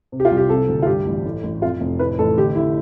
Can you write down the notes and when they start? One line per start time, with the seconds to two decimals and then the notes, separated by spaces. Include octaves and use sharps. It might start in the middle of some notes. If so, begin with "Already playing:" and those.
0.12 C3
0.20 G4
0.25 F4
0.31 C2
0.37 G4
0.49 C3 A4
0.68 D2
0.82 F4
0.87 G2 G4
1.06 A1
1.24 A2
1.43 A1
1.62 F2 F4
1.80 F1
1.99 A2 B4
2.19 A1 A4
2.38 D3 G4
2.56 D3 E4